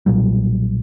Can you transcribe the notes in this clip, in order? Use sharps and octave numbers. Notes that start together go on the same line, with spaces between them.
B1 A#2 F#3 G3